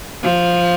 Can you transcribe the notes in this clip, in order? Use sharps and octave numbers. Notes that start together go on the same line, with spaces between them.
F3